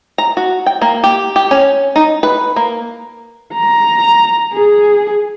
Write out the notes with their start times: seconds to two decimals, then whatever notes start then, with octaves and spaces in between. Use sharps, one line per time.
0.18 A#5
0.37 F#4
0.66 G5
0.82 A#3
1.04 G4
1.36 G4
1.51 C#4
1.96 D#4
2.23 B4
2.56 A#3
3.54 A#5
4.53 G#4